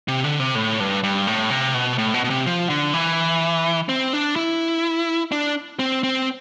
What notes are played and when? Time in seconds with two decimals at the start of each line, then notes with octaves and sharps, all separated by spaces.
0.08 C3
0.24 D3
0.40 C3
0.55 A2
0.80 G2
1.03 G2
1.27 A2
1.50 C3
1.74 B2
1.98 A2
2.14 B2
2.24 B2
2.30 C3
2.46 F3
2.70 D3
2.94 E3
3.89 C4
4.13 D4
4.36 E4
5.32 D4
5.79 C4
6.03 C4